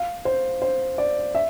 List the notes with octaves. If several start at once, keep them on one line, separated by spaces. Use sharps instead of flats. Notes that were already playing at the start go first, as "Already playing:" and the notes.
Already playing: F5
C5
C5
D5
E5